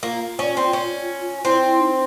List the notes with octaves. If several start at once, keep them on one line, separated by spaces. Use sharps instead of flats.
A#3 F4
C#4
C4
C#4
C4 E4
E4
D#4